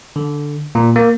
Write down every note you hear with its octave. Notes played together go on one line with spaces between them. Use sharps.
D3
A#2
A#3